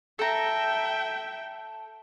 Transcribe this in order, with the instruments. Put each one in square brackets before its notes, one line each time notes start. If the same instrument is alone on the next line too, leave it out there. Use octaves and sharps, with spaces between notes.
[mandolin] A4 A#5 [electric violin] E5 G5